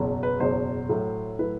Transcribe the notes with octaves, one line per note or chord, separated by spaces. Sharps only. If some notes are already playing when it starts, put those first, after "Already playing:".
Already playing: F#1 E2 B2 F#3
B4
F#1 E2 B2 F#3 C5
A2 F#3 A3 E4
A2 F#3 A3 E4 B4